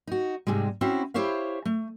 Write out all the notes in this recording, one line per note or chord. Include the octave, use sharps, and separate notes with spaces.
D#4 F#4
G#2 C3 G3 G#3
C4 C#4 E4 F#4 C5
E4 G4 C5 C#5 E5 F5
A3